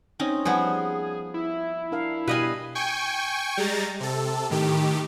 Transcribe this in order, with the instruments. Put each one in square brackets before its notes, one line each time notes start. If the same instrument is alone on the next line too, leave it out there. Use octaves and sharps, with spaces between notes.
[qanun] C4 C#4 D#4
[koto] F3 B3 [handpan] G3 [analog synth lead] G#4
[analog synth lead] E4
[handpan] D4 A#4 F5
[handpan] B2 F5 [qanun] G3 [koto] B4 D#5 G#5
[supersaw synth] G5 G#5 C#6
G3 G#3 A#5 A6
C3 A4
A2 D#3 G4